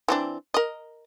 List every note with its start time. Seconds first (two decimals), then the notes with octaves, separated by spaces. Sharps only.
0.08 E3 C4 D4
0.54 A#4 D#5